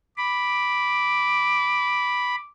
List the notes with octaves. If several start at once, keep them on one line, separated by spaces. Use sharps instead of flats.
B5 D6